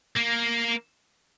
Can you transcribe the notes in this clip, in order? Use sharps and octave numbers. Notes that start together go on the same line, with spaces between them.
A#3